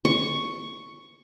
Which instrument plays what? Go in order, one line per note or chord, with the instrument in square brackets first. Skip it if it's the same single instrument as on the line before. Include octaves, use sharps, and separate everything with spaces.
[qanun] C#6